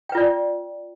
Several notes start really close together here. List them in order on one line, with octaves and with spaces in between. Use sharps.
G5 B4 F4 D5